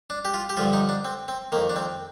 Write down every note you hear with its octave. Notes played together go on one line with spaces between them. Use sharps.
D4
G4
F4
G4
G2 D3 F3 F4
D#4
D4
C4
C4
F2 D#3 A#3
D4
C4